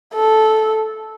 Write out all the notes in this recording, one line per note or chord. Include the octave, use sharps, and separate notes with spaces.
A4